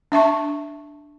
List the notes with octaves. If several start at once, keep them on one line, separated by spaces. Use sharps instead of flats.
D4 E5 A5 C#6